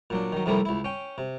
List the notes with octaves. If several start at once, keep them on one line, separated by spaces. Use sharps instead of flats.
A#2 F#3 D4
D#3 F#3
F2 C3 G3 A3 A#3 E4
C#2 E4
C#4 G5
C3